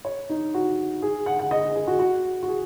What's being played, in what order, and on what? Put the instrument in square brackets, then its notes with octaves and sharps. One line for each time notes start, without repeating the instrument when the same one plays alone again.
[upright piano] C#5
D#4
F#4
G#4
F#5
F#5
D#5
G#4
F#4
F#4
F#4
G#4